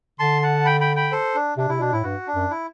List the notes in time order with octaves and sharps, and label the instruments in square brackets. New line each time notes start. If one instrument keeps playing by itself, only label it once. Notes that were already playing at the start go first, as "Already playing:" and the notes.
[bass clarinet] D3 [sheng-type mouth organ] A5 C6
[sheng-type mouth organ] F#5 A5
G5 B5
G5 B5
G5 B5
A4 C5
D4
[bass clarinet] C3 [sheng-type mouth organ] D4
[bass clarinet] C3 [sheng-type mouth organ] E4
[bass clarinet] B2 [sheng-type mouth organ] D4
[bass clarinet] A2 [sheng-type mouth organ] E4
[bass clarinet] G2 [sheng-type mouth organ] F#4
[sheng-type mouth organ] D4
[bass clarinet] F#2
[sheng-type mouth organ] E4